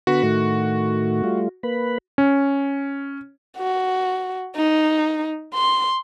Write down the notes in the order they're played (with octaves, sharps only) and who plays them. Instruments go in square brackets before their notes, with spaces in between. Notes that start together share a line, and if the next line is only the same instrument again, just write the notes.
[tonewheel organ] D3 B3 B5 [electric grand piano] F#4
[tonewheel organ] A2 D#3 A3
G3 A3 F4
A#3 B4 B5
[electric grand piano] C#4
[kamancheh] F#4
D#4
C6